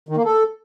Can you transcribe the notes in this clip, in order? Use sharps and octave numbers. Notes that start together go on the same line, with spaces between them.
D#3
A#3
A4